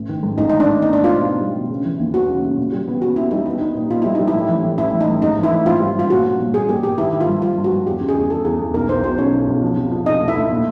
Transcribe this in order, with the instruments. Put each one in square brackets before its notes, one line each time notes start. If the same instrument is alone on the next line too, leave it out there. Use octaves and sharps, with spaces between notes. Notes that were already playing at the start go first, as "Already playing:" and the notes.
Already playing: [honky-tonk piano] A1
D#3
G#2
[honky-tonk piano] A1 [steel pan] D#4
[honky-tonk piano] D#3 [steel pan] D#4
[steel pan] D4
[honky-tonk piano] D#3
[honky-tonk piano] B3 [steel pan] D#4
[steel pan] D4
[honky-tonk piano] B3
[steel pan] F4
[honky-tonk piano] B2
B3
G3
B2
C#3
E3
D#2
[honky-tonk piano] D#2 [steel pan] F#4
[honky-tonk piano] C#3
C#3
A#2
G3
B3
[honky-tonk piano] B3 [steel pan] F#4
[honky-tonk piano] B3 [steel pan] E4
[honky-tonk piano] G3 [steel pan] D#4
[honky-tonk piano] B3 [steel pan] D#4
[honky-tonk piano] D#4
A#2
[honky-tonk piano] A#2 [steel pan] F4
[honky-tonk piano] G3 [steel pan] E4
[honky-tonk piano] G3 [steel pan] D#4
[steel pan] E4
[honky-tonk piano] A2
E3
A2
[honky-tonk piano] A1 [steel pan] E4
[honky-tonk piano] E3
[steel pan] D#4
[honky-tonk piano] A2
[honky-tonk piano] G#1 [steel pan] D#4
[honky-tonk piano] E3
[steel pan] E4
[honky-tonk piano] E3
[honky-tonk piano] G#1 [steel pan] F4
[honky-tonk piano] G3
[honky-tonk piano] G2 [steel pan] F4
[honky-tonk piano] A#2 [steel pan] F#4
[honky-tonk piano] A#2
A#2
[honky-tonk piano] A#2 [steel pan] G#4
[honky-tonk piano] A#3 [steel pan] G4
[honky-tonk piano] A#2 [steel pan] G4
[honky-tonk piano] D#3 [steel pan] E4
[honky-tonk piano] D#3
[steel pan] F4
[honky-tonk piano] G2
[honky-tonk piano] G2 [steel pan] F4
[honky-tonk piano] G2
[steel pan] F#4
[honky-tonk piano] G2
[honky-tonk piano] E2 [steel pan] G4
[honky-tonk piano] C#3
[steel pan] G#4
[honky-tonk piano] E2
[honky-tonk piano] E2 [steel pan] A4
[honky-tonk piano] E2 [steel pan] G#4
[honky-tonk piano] E2
[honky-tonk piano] B1 [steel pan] A#4
[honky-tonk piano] B1 [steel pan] C5
[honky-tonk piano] B2 [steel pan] C5
[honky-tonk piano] B1 [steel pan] C#4 C#5
[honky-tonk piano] B1
B1
F3
C3
F3
[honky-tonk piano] C3 [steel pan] D#4 D#5
[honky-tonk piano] D2
[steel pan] E4 E5
[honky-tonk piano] D2
A#2